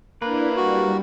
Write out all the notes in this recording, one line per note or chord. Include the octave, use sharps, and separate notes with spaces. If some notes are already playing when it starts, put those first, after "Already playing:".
A#3 D4 E4 B4
G3 F#4